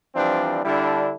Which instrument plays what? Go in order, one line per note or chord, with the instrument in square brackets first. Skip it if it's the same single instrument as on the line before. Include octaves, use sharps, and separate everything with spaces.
[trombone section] E3 F3 G3 C4 D4
D3 G3 D4 E4